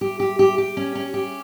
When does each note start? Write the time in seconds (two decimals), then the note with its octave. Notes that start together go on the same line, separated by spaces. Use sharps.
0.01 G4
0.20 G4
0.39 G4
0.58 G4
0.77 C#4
0.95 C#4
1.14 G4